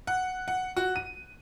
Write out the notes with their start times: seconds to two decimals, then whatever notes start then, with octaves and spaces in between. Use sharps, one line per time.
0.07 F#5
0.48 F#5
0.77 F#4
0.96 D#7